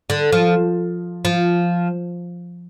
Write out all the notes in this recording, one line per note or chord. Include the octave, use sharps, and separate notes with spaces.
D3
F3
F3